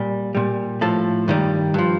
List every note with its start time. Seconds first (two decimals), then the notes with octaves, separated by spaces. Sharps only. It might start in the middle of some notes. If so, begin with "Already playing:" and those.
Already playing: A#2 G3
0.35 A#2 G3
0.81 A2 F3 A4
1.28 G2 D#3 G3
1.74 G2 F3